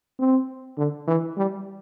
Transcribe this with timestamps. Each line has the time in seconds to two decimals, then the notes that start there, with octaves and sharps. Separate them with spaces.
0.19 C4
0.77 D3
1.07 E3
1.37 G3